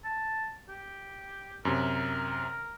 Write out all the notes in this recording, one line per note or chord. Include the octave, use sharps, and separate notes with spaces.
A5
G4
F#2 C3 A#4